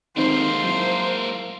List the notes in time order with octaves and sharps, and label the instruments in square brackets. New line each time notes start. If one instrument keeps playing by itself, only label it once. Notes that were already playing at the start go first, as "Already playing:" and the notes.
[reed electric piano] D#3 C4 D#4 [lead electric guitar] G#3 A#3 [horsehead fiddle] C5
[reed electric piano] F#3 E4